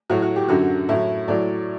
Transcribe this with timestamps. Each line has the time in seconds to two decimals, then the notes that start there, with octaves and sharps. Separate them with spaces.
0.10 A2 F#3 F#4
0.22 F#4
0.36 G4
0.48 F#2 D3 F#3 F#4
0.89 A2 F#3 E4
1.28 A2 F#3 D5